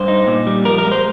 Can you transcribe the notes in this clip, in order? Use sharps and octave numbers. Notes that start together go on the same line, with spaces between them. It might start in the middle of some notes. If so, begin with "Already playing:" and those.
Already playing: G2 C5
D#4
A#2
G3
F3 A#4
A#4
G#3
C5